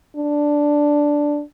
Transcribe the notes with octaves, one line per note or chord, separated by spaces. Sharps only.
D4